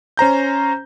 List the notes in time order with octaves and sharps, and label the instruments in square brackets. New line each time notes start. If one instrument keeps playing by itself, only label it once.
[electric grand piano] C#4 C5 A#5 G6